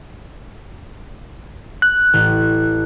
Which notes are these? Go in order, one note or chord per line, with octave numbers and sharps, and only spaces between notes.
F#6
A1